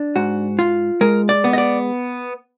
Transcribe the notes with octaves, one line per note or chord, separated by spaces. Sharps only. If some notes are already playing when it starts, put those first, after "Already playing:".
Already playing: D4
G#2 F#4
F4
G#3 A#4
D5
B3
D#5
D5